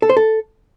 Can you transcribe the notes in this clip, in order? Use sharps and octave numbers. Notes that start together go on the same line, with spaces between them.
A4
C5
A4